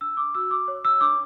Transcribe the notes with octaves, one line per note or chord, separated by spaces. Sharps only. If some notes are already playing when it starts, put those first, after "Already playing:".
D4 E6
D6
F#4 E6
D6
C#5
E6
D4 D6